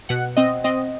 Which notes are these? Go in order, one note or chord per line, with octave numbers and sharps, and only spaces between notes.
B2 F#5
C4 D#5
C4 D#5